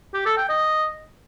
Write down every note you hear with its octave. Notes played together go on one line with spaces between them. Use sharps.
G4
A4
G5
D#5